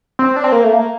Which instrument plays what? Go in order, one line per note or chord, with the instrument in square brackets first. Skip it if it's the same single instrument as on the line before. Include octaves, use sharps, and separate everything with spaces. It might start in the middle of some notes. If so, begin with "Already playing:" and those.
[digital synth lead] C4
D4
C4
A#3
A3
A#3